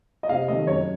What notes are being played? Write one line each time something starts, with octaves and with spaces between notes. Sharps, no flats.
D#5
C3 F5
D#3 A3 D#5
F#2 C#5